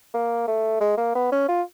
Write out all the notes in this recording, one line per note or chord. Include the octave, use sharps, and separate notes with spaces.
A#3
A3
G#3
A#3
B3
C#4
F4